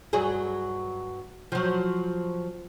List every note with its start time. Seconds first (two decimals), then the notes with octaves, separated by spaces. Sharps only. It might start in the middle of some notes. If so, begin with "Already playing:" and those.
0.13 G2 F#3 G#4
1.52 F3 F#3